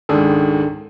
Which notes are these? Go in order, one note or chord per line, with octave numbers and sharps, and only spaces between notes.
C#2 G#2 D#3 D4 G#4 A4